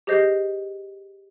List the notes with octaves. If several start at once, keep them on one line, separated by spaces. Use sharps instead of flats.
G4 G#4 C5 D#5 G6 C7